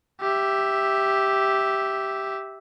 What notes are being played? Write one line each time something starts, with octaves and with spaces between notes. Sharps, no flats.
G4 E5